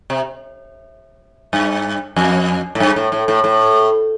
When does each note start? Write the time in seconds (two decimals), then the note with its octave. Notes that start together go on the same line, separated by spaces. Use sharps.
0.10 C3
1.53 G2
2.16 F2
2.75 A2
2.80 G2
2.96 A2
3.12 A2
3.28 A2
3.44 A2